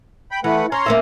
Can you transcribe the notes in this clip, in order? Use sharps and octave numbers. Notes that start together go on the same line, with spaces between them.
G5 B5
E3 A3 B4 F#5
C#4 C#5 A#5 C6
A#3 C#4 E5